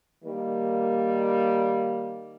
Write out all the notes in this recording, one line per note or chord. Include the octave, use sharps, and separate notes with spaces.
D#3 G3 A#3